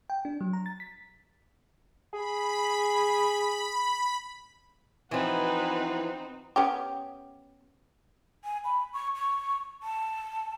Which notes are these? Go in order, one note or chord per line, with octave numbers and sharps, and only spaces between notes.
G5
D4
F#3
A#5
A6
B6
G#4 B5
E3 F3 C4 D#4 F#4 B4
B3 C#4 G4
G#5
B5
C#6
C#6
A5